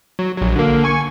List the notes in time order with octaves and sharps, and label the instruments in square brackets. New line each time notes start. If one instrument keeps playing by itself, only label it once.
[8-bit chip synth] F#3
A#1 F#3
D3 A#3
G#5 C#6